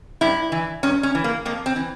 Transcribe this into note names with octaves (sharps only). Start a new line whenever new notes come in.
G2 E4
E3
G2 C#4
C#4
E3
A#3
F2 A#3
C4
E3